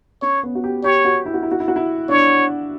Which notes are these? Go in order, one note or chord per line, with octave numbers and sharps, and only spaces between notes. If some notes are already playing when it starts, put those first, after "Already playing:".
C#4 C#5
B3
F#4
G4
G4 C#5
F#4
E4
F#4
E4
F#4
E4
F#4
E4
D4 C#5